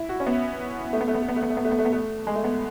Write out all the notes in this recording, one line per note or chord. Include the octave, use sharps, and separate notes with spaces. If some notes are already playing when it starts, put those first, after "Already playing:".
Already playing: E4
F#4
C#4
B3
A3
B3
A3
B3
A3
B3
A3
B3
A3
B3
A3
B3
A3
B3
A3
G#3
A3
B3